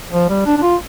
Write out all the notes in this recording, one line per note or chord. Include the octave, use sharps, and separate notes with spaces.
F3
G3
D4
D4
F4